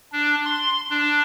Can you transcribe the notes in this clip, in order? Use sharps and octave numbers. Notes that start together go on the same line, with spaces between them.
D4
C6
D4